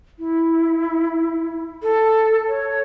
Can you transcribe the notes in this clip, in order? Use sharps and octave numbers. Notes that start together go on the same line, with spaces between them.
E4
A4
C#5